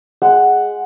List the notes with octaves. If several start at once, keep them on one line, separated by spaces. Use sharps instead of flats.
G#3 F#5